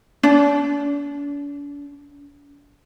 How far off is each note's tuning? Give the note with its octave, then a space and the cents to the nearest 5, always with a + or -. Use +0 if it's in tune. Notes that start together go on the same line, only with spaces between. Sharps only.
D4 -45